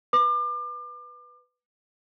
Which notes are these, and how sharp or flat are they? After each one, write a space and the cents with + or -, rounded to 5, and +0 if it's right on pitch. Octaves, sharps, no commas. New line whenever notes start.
B4 -5 D6 +35